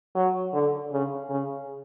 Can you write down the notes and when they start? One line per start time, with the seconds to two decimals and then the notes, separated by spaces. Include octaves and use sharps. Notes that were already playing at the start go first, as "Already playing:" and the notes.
0.15 F#3
0.53 D3
0.92 C#3
1.30 C#3